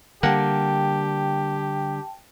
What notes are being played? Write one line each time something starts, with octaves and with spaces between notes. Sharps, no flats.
D3 G3 A#3 G4 F#5 G5 A5